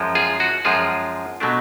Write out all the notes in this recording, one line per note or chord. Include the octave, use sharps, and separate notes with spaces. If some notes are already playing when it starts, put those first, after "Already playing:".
Already playing: F#2 F3 G#3
F4 G#4
F#4
F#2 F3 G#3 F4 G#4
B2 F#3 A3 D4